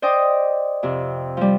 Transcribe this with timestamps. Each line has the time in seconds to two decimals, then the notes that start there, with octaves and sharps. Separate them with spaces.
0.02 C5 D5 D#5 G5 D6 D#6
0.83 F2 C3
1.37 F3 G3